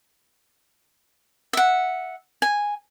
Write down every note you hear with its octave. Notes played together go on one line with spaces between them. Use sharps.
E5 F#5
G#5